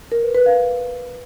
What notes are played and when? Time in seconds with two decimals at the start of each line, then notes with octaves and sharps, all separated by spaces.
0.12 A#4
0.23 B4
0.35 B4
0.46 F5